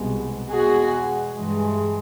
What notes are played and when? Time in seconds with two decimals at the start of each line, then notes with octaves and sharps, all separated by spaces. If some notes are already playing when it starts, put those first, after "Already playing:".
Already playing: C2 B2 G#3
0.50 E2 B2 G#3 F#4 G#4
1.33 G2 E3 G#3